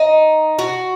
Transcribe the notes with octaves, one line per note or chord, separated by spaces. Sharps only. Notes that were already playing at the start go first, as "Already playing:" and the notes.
Already playing: D#4
F#4